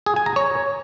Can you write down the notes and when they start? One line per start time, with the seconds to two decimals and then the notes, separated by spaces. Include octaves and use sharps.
0.06 G#4
0.16 G#5
0.26 A#5
0.36 C#5